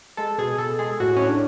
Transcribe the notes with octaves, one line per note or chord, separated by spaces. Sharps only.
G#3 A4
B2 G#4
B2 A4
G#3 G#4
A2 F#4
A2 C#4
D4